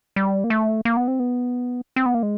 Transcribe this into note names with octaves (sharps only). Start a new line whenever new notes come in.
G3
A#3
A3
A#3
B3
C4
B3
C4
B3
A#3
G#3